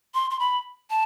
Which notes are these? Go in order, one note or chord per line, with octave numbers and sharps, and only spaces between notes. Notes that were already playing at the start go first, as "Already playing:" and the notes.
C6
C6
B5
A5